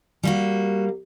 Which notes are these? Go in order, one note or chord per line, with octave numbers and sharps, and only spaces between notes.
G3 A#3 F#4